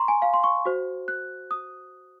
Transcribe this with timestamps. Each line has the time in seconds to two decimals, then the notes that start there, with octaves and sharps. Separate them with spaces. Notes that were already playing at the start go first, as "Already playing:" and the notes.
Already playing: A#5 C6 C#6
0.08 G#5
0.22 F5
0.34 C6
0.44 C#6
0.65 F#4 C5
1.08 F#6
1.51 D#6